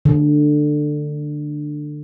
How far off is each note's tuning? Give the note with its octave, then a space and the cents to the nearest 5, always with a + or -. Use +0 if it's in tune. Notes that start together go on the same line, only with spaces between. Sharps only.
D3 +15